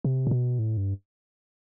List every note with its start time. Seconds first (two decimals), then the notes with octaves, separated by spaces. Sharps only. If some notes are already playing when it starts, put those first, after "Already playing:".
0.04 C3
0.27 A#2
0.31 B2
0.59 A2
0.77 G2